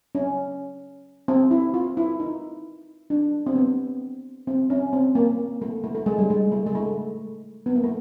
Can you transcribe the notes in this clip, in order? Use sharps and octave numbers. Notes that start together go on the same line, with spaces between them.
C#4
C4
E4
F4
E4
D#4
D4
C4
B3
C4
C#4
C4
A#3
A3
A3
A3
G#3
G3
G#3
A3
G#3
A3
B3
A#3
A3